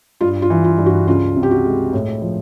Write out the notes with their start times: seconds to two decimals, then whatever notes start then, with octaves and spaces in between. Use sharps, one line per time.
0.21 G2 F4
0.42 F4
0.50 E3
0.64 F4
0.78 G2
0.86 F#4
1.07 C#2 F4
1.36 C3
1.43 G4
1.51 F#4
1.65 G#3
1.93 A2
2.22 F3